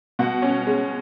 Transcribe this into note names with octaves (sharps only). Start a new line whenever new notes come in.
B2 F#5
C#4
G#3